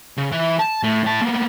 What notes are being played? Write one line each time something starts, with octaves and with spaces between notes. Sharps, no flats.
C#3
E3 E5
A5
A2
A2 A5
A#3 B3